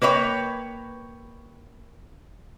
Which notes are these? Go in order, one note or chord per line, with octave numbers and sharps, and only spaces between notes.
A#3 B4 C#5 D#5 G5